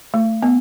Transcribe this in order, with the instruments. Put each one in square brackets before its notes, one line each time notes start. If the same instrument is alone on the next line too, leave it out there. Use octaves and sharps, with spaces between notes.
[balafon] A3
B3